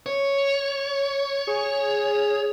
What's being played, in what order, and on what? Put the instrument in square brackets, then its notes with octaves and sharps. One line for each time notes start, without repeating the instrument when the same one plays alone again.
[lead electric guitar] C#5
[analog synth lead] G#4